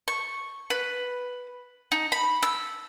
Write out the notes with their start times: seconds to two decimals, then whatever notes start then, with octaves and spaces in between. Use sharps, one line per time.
0.08 C#6
0.70 B4
1.92 D#4
2.12 B5
2.43 E6